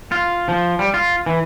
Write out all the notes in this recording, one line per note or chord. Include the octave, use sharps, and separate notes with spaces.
F4
F3
G3
F4
E3